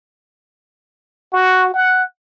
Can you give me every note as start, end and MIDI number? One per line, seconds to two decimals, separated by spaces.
1.33 1.70 66
1.74 2.03 78